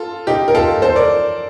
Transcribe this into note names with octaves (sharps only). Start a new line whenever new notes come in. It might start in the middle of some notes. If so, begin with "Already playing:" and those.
Already playing: F4 A4
D#4 G4
A#4
F4 A4
A4 C5
A#4 D5